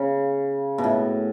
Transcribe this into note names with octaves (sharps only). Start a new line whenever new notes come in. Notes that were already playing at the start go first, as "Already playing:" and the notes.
Already playing: C#3
B2
A2